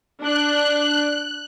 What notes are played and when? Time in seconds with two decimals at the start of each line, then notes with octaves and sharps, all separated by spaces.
0.23 D4 F#6